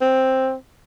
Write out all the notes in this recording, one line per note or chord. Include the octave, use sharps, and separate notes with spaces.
C4